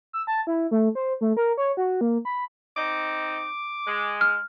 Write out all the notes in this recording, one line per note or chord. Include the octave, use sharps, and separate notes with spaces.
E6
A5
E4
A3
C5
A3
A#4
C#5
F#4
A#3
B5
C4 D#4 D6
G#3
F6